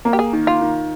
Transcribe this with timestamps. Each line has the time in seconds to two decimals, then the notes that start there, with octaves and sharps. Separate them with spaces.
0.05 A#3
0.13 G4
0.19 G#4
0.33 D#3
0.47 F4
0.61 D#3